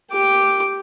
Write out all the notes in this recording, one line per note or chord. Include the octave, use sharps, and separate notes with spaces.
G4 D6